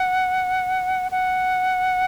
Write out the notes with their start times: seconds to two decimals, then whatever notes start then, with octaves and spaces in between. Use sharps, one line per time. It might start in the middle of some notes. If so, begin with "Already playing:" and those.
Already playing: F#5
1.11 F#5